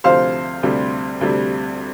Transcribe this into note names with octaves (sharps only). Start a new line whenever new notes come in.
D2 C3 F3 C5 F5
D2 C3 G3
D2 C3 G3